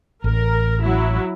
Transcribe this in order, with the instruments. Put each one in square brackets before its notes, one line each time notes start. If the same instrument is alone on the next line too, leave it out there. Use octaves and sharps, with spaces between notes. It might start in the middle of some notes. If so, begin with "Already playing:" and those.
[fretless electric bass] A1 [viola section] A#4
[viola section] F#3 E4